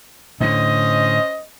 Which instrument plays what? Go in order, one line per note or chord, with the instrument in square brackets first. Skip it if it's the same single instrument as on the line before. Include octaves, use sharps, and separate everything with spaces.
[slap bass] A2 D3 [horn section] C#4 C5 D#5